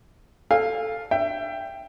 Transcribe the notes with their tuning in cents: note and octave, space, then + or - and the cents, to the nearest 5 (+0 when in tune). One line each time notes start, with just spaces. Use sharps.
A4 +0 F5 +0 G#5 -40
D4 +15 E5 +25 G5 +0